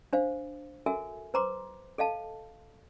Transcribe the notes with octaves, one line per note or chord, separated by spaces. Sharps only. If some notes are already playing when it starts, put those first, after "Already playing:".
D4 C5 F5
F#4 A4 A#4 E5 G#5
B4 C5 A#5 C6 D6
A4 D#5 F5 A5